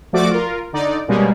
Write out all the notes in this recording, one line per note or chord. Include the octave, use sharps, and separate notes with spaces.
F3 A3 F#4 D5 D6
F4 A#4
D3 D#4 D5
B2 G3 G#3 A#3 C#4